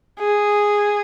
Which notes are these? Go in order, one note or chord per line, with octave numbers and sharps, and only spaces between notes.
G#4